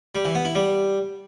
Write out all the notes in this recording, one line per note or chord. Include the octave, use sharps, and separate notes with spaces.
G3
E3
B3
E4
G3